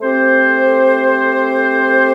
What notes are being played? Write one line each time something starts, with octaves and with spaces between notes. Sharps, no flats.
A3 C4 G4 C5